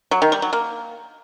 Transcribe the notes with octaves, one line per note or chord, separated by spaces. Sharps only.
F#3
D#3
G3
F#3
A#3